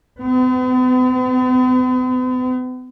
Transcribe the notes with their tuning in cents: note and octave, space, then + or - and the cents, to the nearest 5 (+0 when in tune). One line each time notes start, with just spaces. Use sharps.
B3 +45